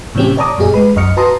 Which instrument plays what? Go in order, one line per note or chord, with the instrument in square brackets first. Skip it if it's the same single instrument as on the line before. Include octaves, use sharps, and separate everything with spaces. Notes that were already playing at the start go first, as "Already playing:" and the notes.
[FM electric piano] A2 C3 E3 C4 C#4 G4
C#5 D5 A5 A#5 D6 D#6
F#2 A#2 G4 G#4 D#5
G#3 B4 B5
B1 F#2 D#5 F6 C#7
F#4 B4 A5 A#5 C6 D#6